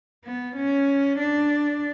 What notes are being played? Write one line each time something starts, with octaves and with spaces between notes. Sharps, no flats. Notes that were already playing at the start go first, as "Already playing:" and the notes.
B3
C#4
D4